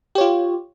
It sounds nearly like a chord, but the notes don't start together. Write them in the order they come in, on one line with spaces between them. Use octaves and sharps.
G4 C#5 F4